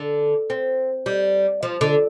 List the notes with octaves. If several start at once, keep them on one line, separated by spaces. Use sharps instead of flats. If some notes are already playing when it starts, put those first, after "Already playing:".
Already playing: D3
C4
G3
F3
D3